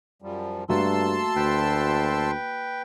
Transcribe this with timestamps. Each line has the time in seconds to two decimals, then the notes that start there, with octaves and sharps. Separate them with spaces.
0.22 F#2 F3 G3
0.69 G2 A3 A#3 F#4 A5 C6 E6
1.36 D2 B4 G5